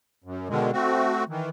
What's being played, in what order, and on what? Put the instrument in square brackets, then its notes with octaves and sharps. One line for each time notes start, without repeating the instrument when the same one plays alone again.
[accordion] F#2
B2 D3 D#3 G#3
A3 C4 F#4
D#3 E3